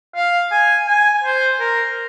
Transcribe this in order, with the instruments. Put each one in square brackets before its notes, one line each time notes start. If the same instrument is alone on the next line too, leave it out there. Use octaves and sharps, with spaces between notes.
[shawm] F5
G#5
G#5
C5
A#4